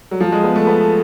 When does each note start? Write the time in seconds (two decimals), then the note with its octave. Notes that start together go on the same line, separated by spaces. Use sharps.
0.11 F#3
0.20 F3
0.32 G#3
0.44 B3
0.56 A3
0.67 B3